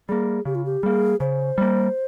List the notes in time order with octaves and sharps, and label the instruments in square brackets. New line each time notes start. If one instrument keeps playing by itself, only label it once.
[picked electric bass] G3 A#3 [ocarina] G#4
[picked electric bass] C#3 [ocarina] G4
[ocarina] F4
G4
[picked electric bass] G3 A#3 [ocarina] G#4
[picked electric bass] C#3 [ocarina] C5
[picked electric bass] G3 A#3